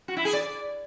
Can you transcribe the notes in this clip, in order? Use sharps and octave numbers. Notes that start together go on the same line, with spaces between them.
F#4
E4
G#4
D5